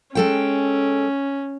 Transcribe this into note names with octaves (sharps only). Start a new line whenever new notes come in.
G#3 C#4 A4 G5